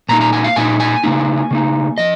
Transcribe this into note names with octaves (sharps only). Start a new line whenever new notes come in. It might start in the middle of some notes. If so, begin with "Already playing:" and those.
A#2 A#3 D#4 A#5
A#5
G#5
F5
A#2 A#3 D#4 G#5
G#5
C#3 A#3 D#4
C#3 A#3 D#4
F3 D#5